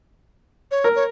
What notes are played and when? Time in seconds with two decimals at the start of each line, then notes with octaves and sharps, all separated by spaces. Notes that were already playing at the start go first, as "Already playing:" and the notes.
0.71 C#5
0.84 A#4
0.96 C#5